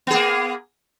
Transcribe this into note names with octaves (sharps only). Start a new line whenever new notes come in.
A#3 B3 G#4